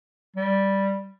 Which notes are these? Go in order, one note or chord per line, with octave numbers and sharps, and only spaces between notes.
G3